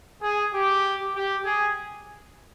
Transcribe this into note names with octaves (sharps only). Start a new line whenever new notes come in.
G#4
G4
G4
G#4